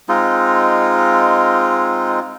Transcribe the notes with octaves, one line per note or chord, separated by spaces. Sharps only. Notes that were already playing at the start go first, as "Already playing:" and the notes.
G#3 C4 D#4 F4